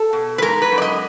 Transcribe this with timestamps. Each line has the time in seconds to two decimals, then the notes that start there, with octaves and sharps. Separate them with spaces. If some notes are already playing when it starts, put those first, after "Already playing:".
Already playing: A4
0.13 B2
0.38 B4
0.42 G#3 A#4
0.62 B4
0.72 F#2
0.78 D5
0.82 D#5